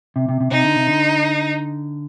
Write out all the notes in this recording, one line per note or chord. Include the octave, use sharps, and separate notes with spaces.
C3
C3
C3
C3 D#4
D3
C3
D3